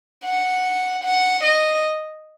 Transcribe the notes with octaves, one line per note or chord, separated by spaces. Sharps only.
F#5
F#5
D#5